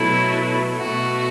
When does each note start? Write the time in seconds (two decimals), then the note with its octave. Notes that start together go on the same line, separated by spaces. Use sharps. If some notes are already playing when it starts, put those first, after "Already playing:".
Already playing: B2 F#3 A3 E4
0.77 B2 A3 F#4